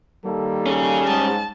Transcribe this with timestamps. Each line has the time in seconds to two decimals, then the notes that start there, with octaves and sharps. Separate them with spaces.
0.25 D#3 G3 A#3 A4
0.66 C#4 G#4
1.07 G#2 A5